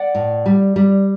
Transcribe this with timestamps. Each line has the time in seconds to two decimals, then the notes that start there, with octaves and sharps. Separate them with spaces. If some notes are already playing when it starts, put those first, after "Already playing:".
Already playing: D5 F#5
0.15 A2
0.46 G3
0.76 G3